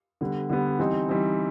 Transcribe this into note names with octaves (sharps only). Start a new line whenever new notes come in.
D3 G3 B3
D3 G3 B3
E3 G3 C4 D#4
E3 G3 C4 D#4